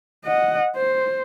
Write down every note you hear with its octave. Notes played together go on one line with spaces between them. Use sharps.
D#5 F#5
C5